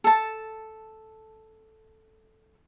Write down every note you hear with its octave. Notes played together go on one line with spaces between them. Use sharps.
A4 A5